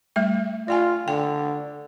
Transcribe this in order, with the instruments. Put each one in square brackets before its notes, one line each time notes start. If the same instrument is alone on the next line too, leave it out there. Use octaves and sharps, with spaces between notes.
[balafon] G3 A3 E5
[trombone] F4 [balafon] D5 G5 G#5
[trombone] D3 [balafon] G5